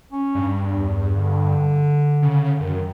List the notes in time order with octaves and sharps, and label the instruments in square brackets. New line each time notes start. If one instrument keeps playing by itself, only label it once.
[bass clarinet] C#4
[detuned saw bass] G2
[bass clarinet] E2
D3
[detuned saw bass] C#3
[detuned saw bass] F#2 [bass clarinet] D#3